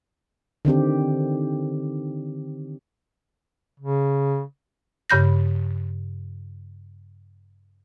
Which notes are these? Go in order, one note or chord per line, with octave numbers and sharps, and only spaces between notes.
D3 D#3 C4 G4
C#3
G2 C#3 B5 G6 A#6